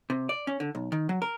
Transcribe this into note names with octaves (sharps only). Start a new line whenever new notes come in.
C3
D5
C#4
D3
B1
D#3
F#3
A#4